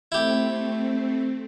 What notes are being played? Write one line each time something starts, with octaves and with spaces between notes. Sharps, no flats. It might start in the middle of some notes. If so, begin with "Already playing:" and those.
A3 C4 E4 G4